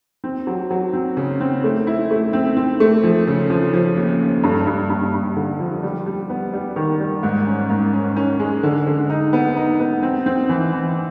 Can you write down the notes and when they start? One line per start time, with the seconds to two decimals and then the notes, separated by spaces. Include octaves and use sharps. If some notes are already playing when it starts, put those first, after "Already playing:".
0.24 C4
0.47 F#3
0.70 F#3
0.93 C4
1.17 C#3
1.40 C4
1.64 A3
1.87 E4
2.11 A3
2.33 C4
2.57 C4
2.80 A3
3.04 F3
3.27 C#3
3.50 F3
3.74 F3
3.97 D#2
4.20 D#2
4.43 G2
4.67 G2
4.90 G2
5.14 G2
5.36 D3
5.60 F3
5.83 G3
6.06 G3
6.30 B3
6.53 G3
6.76 D#3
7.00 G3
7.23 G#2
7.47 C#4
7.70 G#2
7.93 C#4
8.16 C#4
8.39 G#3
8.63 D3
8.87 D3
9.10 D#4
9.33 B3
9.57 D#4
9.80 B3
10.03 C4
10.26 C4
10.49 E3
10.73 E3